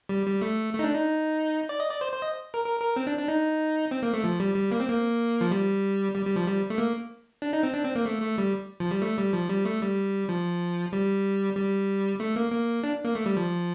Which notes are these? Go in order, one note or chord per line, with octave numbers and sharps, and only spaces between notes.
G3
G3
A3
A3
D#4
D4
D#4
D5
D#5
D5
C5
C5
D#5
A#4
A#4
A#4
C4
D4
D4
D#4
C4
A#3
A3
F3
G3
G3
A#3
C4
A#3
F3
G3
G3
G3
F3
G3
A3
A#3
D4
D#4
C4
D4
C4
A#3
A3
A3
G3
F3
G3
A3
G3
F3
G3
A3
G3
F3
G3
G3
A3
A#3
A#3
D4
A#3
A3
G3
F3